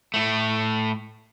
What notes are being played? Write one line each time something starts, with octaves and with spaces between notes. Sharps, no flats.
A2 A3